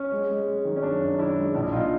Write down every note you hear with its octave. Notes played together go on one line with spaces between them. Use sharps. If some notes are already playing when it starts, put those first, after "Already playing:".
Already playing: C#4
G#3
G#3
G#3
D#3
C#4
F#2 D4
F#2
D#3 D4 E4
G#3
A#1 D4 E4
A#1 D#4 F4